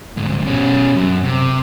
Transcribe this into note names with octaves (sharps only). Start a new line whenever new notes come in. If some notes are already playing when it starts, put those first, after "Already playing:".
D2 G#2
B2 C#4
F#2
C3